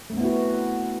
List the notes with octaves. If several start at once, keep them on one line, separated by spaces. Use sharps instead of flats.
A3 B3 C4 E4 F#4